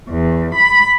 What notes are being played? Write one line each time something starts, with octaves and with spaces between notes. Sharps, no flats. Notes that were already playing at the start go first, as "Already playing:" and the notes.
E2
B5